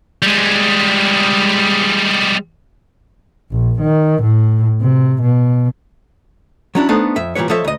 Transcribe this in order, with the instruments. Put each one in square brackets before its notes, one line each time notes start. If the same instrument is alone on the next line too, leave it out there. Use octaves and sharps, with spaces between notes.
[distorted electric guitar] G3 G#3
[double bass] A#1
D#3
A2
C3
B2
[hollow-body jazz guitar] F#3 C#4 D4 E4
A3 B3 D4 D#4 A4 C5
F2 E5
A#2 E3 G3 B4 C#5
F3 A4 C#5 D#5 E5
D2 D#5